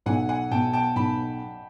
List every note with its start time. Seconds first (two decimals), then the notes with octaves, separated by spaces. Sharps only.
0.06 B1 F#5 G#5
0.29 F#5 G#5
0.51 B2 G5 A5
0.73 G5 A5
0.96 B1 A5 B5